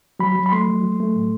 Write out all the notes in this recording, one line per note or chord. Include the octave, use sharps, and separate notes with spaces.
F#3 B5
F#3
B5
A3 C6
F#3
F#3
A3
A2